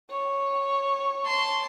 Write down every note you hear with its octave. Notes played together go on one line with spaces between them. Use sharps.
C#5
A5 C6